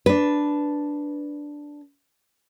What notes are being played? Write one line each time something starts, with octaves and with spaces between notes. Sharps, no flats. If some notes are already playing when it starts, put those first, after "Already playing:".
D4 B4